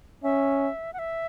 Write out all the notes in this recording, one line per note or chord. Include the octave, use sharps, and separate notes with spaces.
C#4 E5
F#5
E5